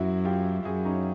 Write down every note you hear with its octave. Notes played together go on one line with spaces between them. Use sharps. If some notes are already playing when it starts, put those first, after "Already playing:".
Already playing: F#2 E4 F#4
F4 G4
F#2 F#4 G#4
C#4 D#4